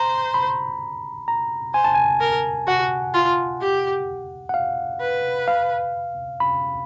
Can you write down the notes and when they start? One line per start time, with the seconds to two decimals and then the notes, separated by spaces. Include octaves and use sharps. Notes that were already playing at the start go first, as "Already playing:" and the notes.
Already playing: C5 A#5
0.34 B5
1.28 A#5
1.74 C5 G#5
1.84 A5
1.95 G#5
2.20 A#4
2.67 F#4 F#5
3.14 F4
3.61 G4
4.49 F#5
4.54 F5
5.01 B4
5.48 F5
6.40 B5